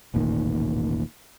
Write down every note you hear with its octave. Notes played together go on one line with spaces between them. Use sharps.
E1 A1 A#2 D#3